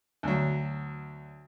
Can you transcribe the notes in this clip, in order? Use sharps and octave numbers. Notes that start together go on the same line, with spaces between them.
D2 F#3